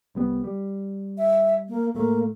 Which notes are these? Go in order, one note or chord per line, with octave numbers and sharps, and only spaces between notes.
C2 G3 B3
G3
E5
A#3
A2 A3 A#3